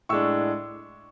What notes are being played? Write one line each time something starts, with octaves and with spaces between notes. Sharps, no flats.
A2 G#3 D4 C#6 E6